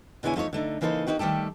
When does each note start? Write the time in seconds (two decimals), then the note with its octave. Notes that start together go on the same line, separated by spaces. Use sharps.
0.23 B2 D3 G#3 E4 C#5 G#5
0.36 F3 A3 D#4 C#5
0.53 D3 A3 D#4
0.81 C#3 E3 A#3 D#4 A4 C5
1.07 A#3 C#4 D#4 F#4 G4
1.19 D#3 G3 A3 G4 A4